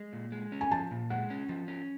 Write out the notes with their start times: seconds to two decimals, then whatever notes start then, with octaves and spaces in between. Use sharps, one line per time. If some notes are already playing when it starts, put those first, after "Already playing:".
Already playing: G#3
0.13 A#2
0.32 G#3
0.52 C#4
0.61 G#5
0.71 F3 A5
0.91 A#2
1.10 G#3 F#5
1.30 C#4
1.49 F3
1.68 C#4